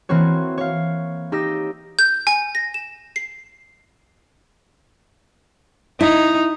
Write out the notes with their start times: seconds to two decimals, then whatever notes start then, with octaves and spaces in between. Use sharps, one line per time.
0.09 E3 A#3 C4 F#4 C#5
0.58 C#5 F5
1.32 D#4 G4 E6 A#6
1.99 G6
2.27 G#5
2.55 A#6
2.74 E7
3.16 C7
6.01 D#4 E4